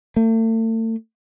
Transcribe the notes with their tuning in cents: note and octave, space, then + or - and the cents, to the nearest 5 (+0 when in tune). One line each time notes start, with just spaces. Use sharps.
A3 +40